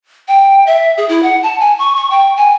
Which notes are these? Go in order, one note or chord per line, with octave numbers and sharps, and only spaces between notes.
G5
E5
G#4
E4
F#5
A5
G#5
C#6
C#6
G5
G#5